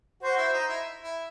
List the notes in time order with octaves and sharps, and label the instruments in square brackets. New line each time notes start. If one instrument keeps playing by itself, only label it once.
[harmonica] F#4 [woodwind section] C5
[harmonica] E4
D#4
E4
E4